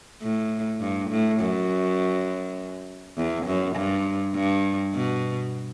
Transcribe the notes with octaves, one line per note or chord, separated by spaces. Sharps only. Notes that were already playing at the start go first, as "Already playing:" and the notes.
A2
G2
A2
F#2
E2
F#2
G2
G2
B2